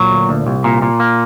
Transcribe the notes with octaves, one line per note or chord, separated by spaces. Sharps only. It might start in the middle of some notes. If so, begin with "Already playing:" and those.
Already playing: A#2 F#3
D2
D2
C2
A#2
A#2
A#3